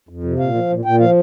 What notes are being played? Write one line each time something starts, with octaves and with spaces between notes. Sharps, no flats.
F2
C3
A#2 F5
F3
A#2
A#2 G5
F3 F5